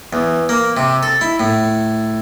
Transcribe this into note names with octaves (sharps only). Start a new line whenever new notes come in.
E2
A#3
C3
A4
E4
A2